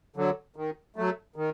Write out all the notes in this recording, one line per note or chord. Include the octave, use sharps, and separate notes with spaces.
D3 F#3
D#3
F#3 A3
D#3